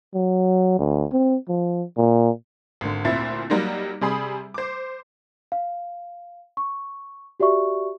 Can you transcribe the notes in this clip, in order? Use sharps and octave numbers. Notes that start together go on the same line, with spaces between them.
F#3
D2
C4
F3
A#2
G#1 D3
D2 A#2 C4 E4 E5 A6
F#3 G3 A#3 D#4
C3 G3 G#4 B5 D#6
C5 D6
F5
C#6
F#4 G4 D5 E5 C#6